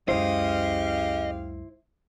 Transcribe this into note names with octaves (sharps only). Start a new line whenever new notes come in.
C#2 F#2 C#3 E4 G4 C5 D#5 F5